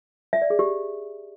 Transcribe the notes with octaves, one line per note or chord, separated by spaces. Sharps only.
E5
D5
G#4
G4